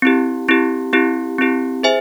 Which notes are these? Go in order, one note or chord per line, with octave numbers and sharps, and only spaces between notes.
C4 E4 G4
C4 E4 G4
C4 E4 G4
C4 E4 G4
G#4 C5 E5 G#5